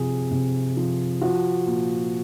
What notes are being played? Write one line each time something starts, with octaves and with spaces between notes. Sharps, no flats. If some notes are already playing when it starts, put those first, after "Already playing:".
Already playing: C3 F3 G#4
C3
F3
F3 F#4
A#2